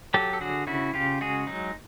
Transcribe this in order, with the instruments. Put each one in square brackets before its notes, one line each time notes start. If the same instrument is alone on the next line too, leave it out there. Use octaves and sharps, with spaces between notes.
[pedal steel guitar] F#3 G4 A4
A4
D3 F#4 G#4
C#3 E4 F#4
C#3 F4 G4
G#3 F#4 G#4
F#3 D#4